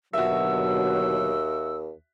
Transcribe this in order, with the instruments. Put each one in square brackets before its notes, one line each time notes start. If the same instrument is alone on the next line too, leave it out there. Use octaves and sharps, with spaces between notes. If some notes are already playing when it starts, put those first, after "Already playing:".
[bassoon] D#2 [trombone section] B2 D3 F#3 [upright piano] F#4 E5 [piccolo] E6